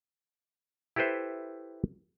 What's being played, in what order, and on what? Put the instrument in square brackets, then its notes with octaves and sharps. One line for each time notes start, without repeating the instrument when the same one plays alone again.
[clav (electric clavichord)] E4 G4 A4 B4 C5 E5